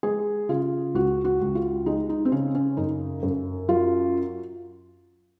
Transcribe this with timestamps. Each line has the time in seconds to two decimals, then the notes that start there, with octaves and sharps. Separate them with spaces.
0.03 G#3 G#4
0.49 C#3 F4
0.94 C#2 F#4
1.25 F#4
1.41 C#2
1.55 F4
1.86 G#3 D#4
2.09 D#4
2.25 C4
2.32 C#3 C#4
2.55 C#4
2.77 F#2 D#4
3.23 F#2
3.68 F#3 F4